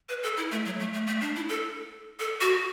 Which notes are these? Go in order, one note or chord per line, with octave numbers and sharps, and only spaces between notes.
B4
A4
E4
A3
F#3
A3
A3
A3
D4
E4
A4
A4
F#4